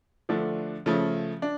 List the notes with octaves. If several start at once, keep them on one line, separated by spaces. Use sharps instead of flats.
D3 F3 A3 D4
C#3 F3 A3
D4